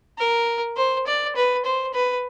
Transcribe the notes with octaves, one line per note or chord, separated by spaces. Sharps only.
A#4
C5
D5
B4
C5
B4